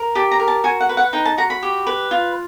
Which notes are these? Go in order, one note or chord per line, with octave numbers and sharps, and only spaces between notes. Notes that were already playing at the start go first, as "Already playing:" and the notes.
Already playing: A#4
G4 A5
A#5
A#4
A5
F#4 G#5
F#5
B4
F#5
D#4 G5
A5
F#4 A#5
B5
G4
B4
F4